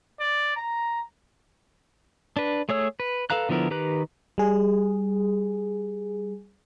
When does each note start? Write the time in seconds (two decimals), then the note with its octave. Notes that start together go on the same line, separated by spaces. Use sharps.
0.20 D5
0.56 A#5
2.37 D4 B4
2.69 A3 G#4 C#5 E6
3.00 B4
3.30 A4 B4 F5 A#5 F#6
3.49 D3 F3 B3 E4 A#4
3.70 D#3 G4 B4 A#5 F#6
4.38 G3 G#4